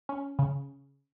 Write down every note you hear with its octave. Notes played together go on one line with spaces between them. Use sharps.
C#4
C#3